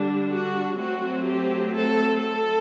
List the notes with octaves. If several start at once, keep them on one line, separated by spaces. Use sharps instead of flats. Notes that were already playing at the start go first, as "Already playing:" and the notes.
Already playing: D3 G3 D4
F#4
F#3 A3 C4 F#4
G4
A4
A4